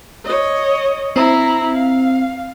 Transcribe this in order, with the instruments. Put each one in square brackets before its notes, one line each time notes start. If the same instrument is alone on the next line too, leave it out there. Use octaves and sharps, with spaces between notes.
[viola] C#5 D#5
[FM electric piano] C4 [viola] E4 A#5
[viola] F5